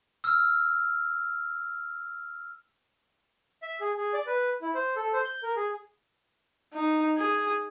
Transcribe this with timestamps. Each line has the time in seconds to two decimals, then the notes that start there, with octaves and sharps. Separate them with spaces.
0.24 E6 F6
3.62 E5
3.81 G#4
3.98 G#4
4.14 D5
4.27 B4
4.62 E4
4.74 C5
4.96 A4
5.13 C5
5.25 G6
5.43 A#4
5.56 G#4
6.73 D#4
7.18 G#4